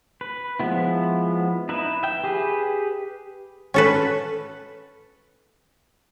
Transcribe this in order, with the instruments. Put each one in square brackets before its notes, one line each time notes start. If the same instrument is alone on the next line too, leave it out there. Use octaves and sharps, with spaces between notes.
[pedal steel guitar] B4
F3 G#3 B3 E4
D#4 E4 B4 E5
E5 G5
G4 G#4 B4
[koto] C#4 A4 B4